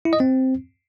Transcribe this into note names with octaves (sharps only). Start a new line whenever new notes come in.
E4
D#5
C4